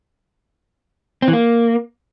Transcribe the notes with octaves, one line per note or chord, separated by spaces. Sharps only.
C4
E3
A#3